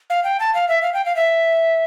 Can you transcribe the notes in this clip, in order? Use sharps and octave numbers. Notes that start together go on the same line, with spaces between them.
F5
G5
A5
F5
E5
F5
G5
F5
E5